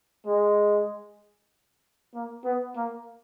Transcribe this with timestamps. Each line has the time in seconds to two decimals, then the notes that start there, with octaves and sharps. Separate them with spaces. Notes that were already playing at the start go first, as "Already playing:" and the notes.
0.26 G#3
2.14 A#3
2.45 B3
2.77 A#3